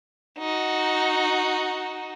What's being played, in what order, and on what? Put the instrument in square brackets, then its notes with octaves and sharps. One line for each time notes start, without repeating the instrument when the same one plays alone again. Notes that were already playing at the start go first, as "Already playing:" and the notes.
[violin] D#4 F#4